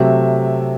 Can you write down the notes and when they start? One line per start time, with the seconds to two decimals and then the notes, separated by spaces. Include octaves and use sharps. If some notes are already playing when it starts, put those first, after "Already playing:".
Already playing: C3 F#3 A3 E5